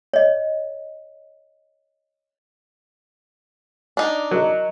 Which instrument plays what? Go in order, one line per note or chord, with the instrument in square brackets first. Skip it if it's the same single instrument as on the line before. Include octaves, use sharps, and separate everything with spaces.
[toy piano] C#5 D#5
[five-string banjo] D4 D#4
[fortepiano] F#3 [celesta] A#4 D#5